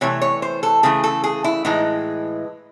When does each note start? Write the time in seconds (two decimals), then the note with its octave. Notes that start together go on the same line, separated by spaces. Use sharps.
0.01 C3 E3 A3 C#5
0.22 C#5
0.42 C5
0.63 A4
0.83 C#3 E3 A3 G#4
1.04 A4
1.24 G#4
1.44 E4
1.65 A2 E3 G#3 D#4